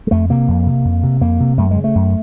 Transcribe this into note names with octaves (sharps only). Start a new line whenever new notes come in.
G#3
F2 A3
C3 A#3
F2
C3
F2
C3
F2 A#3
C3
F#2 A3
G#3
C#3
A3
F#2